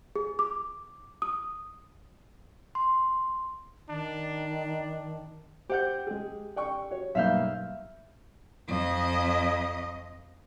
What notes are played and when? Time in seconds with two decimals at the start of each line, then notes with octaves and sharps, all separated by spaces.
0.16 G#4
0.39 D6
1.22 D#6
2.75 C6
3.89 D#3 D4
5.69 G4 C5 F#5 G6
6.07 G#3 G#4
6.56 D5 G5 C#6
6.90 F#4 C#5
7.15 B1 G2 A#3 E5 F5 G6
8.68 F2 D#5